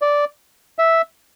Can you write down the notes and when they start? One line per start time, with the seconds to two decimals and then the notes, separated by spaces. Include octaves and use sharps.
0.02 D5
0.79 E5